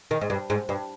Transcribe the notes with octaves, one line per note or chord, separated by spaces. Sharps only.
D#3
G#2
G2
G#2
G2